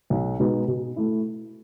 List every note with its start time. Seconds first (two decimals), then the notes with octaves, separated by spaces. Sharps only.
0.10 B1
0.39 B2 G#3 B3 D#4
0.68 B2
0.96 A3 E4